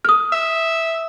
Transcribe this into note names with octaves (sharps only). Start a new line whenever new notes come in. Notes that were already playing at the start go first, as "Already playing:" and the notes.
D#6 F6
E5